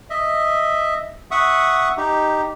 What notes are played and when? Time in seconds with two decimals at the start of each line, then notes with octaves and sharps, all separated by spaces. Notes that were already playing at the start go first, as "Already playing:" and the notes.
0.10 D#5 E5
1.31 E5 F#5 C#6 D#6
1.97 D#4 G4